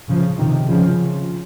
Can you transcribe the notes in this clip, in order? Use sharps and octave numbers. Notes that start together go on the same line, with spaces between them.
C#3 F3
C3 D#3
C#3 F3